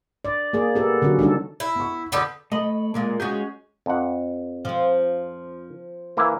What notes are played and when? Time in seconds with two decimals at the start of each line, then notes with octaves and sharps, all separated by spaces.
0.25 D5
0.53 A#3 G#4 D5
0.75 B3 G4 A4 A#4
1.02 D3 F#3 C#4 F#4
1.19 D#3 G3 D4 A4
1.60 E4
1.75 B3 C#6
2.12 D3 B3 B4 F#5 D#6 G6
2.52 A3 D#5 B5
2.94 A#2 G#3 A#3 F4
3.20 G#3 C#4 F#4 G#4 G6
3.86 F2 F#5
4.65 F3 C4
6.17 E3 A#3 E4